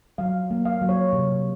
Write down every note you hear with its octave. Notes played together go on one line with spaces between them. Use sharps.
F#3 F5
A#3
F5
F#3
C#5
C3